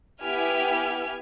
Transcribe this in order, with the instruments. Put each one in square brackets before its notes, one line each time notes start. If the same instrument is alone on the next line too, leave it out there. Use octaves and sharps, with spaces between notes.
[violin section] B3 E4 G4 G#5 F6